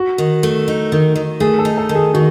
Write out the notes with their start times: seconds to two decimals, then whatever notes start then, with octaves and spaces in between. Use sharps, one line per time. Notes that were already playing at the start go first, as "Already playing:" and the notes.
Already playing: F#4
0.18 D#3
0.43 A3
0.68 D#4
0.92 D#3
1.16 D#3
1.40 A3 G#4
1.59 A4
1.65 D#4
1.78 A4
1.89 D#3
1.95 G#4
2.14 D#3 F#4